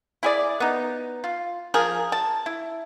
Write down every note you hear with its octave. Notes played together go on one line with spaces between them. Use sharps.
E4 G#4 D5
B3 D#4
F4
F3 G#4 A#4
A5
E4